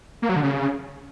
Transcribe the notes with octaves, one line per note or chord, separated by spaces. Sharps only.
A#3
F#3
D3
C#3